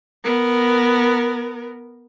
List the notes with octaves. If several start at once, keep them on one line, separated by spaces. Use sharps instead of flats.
B3 A#4